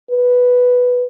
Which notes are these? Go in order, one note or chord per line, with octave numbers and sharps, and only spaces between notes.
B4